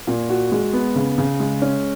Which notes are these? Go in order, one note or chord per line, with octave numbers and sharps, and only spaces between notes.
A#2
F#4
G#3
B3
C#3
C#3
G#3
C#4